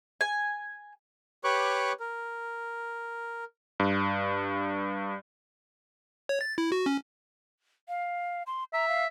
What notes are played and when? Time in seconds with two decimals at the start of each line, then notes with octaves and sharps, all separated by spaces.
0.21 G#5
1.44 G4 B4 C#5 C#6 D6 F#6
2.00 A#4
3.80 G2
6.29 C#5
6.41 A6
6.58 E4
6.72 F#4
6.86 C#4
7.88 F5
8.47 C6
8.73 E5 A#5
8.88 F5